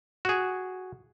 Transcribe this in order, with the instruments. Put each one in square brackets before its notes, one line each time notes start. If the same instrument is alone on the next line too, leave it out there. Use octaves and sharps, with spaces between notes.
[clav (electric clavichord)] F#4 G#4